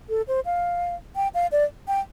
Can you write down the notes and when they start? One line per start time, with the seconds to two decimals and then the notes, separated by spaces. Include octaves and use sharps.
0.09 A4
0.28 C5
0.45 F5
1.16 G5
1.34 F5
1.52 D5
1.88 G5